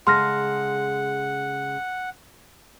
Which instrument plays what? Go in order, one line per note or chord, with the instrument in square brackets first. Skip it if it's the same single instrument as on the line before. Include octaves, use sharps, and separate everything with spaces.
[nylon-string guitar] C#3 G#3 A4 [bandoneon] F#5 [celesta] C6 F6 A#6